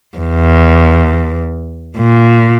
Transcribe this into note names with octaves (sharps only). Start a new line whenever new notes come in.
E2
A#2